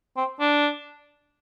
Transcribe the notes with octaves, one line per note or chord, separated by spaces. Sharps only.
C4
D4